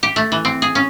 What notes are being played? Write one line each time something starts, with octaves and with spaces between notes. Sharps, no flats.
G4
A3
E3
C4
G#4
C#4